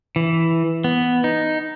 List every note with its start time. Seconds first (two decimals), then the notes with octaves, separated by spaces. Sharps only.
0.16 E3
0.84 B3
1.24 D#4